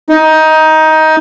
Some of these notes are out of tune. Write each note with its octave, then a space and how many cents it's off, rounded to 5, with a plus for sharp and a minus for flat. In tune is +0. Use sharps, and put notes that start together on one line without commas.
D#4 +15